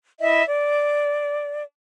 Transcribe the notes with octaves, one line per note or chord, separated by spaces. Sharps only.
E4 D#5 E5
D5